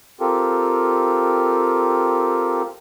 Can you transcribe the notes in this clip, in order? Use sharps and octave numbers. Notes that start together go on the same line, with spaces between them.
C4 F4 G4 A4 A#4